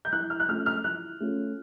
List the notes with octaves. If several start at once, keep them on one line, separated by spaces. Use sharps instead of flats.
G6
E3 F#6
F6
F#6
A3 C#4 F4 F6
F6
E3 F#6
A3 C#4 F4